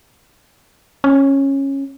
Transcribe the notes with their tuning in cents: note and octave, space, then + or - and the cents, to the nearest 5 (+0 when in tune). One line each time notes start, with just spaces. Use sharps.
C#4 -15